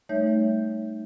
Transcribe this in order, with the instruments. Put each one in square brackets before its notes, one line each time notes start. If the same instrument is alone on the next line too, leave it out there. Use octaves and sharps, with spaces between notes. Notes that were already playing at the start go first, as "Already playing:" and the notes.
[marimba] G3 A3 D#4 C#5 E5 G6